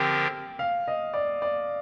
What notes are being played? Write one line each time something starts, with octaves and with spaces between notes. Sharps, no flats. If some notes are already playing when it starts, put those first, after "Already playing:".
Already playing: D3 F3 C4 G4 A#4 G5
F5
D#5
D5
D5